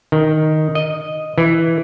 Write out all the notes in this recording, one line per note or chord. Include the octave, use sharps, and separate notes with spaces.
D#3
D#5
E3